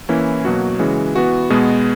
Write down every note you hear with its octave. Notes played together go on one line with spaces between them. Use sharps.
E3 A#3 C#4 E4
B2 F#3 A#3 F#4
C#3 E3 G#3 C#4
E3 B3 F#4
B2 G#3 B3